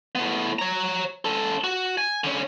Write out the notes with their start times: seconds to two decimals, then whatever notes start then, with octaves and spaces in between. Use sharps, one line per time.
0.15 A2 B3
0.59 C#5 A#5
1.25 C#4 A4
1.64 F#4
1.98 G#5
2.24 D3 C#4